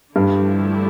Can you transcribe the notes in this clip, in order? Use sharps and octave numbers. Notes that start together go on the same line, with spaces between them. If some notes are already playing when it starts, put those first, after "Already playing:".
G2 D3 F3 A3 E4 G4